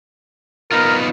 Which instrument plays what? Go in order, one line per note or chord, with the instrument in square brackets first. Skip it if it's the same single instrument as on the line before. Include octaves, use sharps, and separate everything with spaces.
[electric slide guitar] B3 D#4 F4 [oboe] A#4